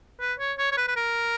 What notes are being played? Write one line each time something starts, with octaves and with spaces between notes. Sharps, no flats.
B4
C#5
C#5
C#5
B4
B4
A#4